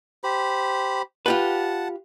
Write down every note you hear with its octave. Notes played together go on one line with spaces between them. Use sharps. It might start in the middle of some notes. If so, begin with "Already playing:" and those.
G4 C5 B5
F4 G4 B4 F#5 A5